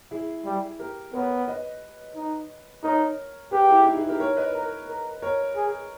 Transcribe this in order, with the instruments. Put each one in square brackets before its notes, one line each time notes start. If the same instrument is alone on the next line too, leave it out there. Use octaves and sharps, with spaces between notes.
[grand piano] E4 G#4
[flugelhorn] G3
[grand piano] G4 A#4
[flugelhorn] B3 [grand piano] A#4 C#5
[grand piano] B4 D#5
[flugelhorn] D#4
[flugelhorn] D#4 [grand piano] A#4 C#5
[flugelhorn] G4 [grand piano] G#4 B4
[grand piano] E4 G#4
D#4 G4
E4 G#4
G4 A#4
A#4 C#5
B4 D#5
[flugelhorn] A#4
A#4
[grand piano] A#4 C#5
[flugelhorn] G#4